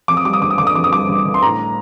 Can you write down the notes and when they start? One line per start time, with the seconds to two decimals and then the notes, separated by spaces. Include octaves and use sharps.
0.08 F2 D6
0.17 D#6
0.25 G3 D6
0.33 D#6
0.41 G1 D6
0.50 D#6
0.58 D3 D6
0.67 D#6
0.75 F2 D6
0.84 D#6
0.92 G3 D6
1.09 G1
1.25 D3
1.34 C6
1.42 A2 A#5